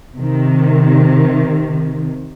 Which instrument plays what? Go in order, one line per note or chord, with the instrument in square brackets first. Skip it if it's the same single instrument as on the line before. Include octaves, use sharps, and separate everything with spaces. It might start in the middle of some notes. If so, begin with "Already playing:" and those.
[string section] C3 D#3